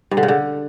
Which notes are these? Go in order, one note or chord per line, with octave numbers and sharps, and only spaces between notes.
G2
D3
C#3
D3